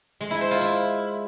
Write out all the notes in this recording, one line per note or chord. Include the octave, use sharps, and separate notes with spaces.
G#3
E4
C5
F4
E4